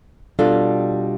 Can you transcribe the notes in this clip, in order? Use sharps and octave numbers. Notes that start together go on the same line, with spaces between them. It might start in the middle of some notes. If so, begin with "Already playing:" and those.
B2 G3 D4 F4 A4